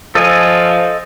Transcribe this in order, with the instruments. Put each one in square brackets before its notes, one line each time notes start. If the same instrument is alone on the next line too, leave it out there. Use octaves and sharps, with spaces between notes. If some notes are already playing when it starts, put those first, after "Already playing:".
[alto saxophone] F3 [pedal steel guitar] A4 D#5 G#5